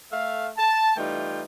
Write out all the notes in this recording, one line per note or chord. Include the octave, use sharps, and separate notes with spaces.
A3 E5 F5
A5
E3 G3 A3 D#4 F4 G5